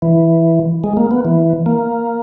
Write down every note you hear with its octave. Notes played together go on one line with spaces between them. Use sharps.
E3
G#3
A#3
B3
E3
A#3